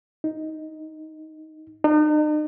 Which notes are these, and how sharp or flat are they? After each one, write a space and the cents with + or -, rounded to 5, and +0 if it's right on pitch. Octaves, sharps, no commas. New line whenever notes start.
D#4 +10
D#4 -40